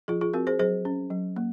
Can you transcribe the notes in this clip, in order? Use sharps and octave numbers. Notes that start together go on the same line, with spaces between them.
F3 F4 G#4
F4 G#4
C4 F#4 A#4
G#4 C5
F#3 G#4 C5
C#4
F#3
A#3